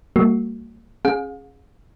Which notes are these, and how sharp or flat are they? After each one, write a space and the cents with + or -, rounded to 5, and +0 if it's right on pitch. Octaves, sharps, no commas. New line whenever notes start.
G3 +0 A#3 -35 F#4 +0
C#4 -30 G#4 +0 F5 +40